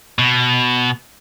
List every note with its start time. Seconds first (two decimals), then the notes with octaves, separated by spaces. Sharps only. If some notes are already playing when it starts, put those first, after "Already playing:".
0.19 B2